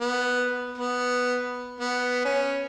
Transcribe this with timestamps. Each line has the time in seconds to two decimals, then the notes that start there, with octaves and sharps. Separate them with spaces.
0.01 B3
0.78 B3
1.80 B3
2.25 C#4